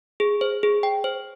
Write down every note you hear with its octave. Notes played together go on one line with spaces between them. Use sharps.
G#4
C5
G#4
G5
C5